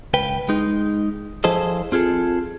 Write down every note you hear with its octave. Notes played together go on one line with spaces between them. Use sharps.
C#2 B4 G5
G#3 D#4
F3 E4 G#4 A4 C5 D#5
C4 F4 G#4 A4